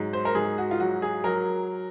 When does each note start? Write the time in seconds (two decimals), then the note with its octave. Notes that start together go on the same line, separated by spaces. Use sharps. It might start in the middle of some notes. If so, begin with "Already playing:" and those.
Already playing: G#2 F#3
0.13 C5
0.25 A#4
0.35 G#2 G#4
0.58 F#4
0.71 F4
0.80 F#3 F#4
1.02 G#4
1.24 F#3 A#4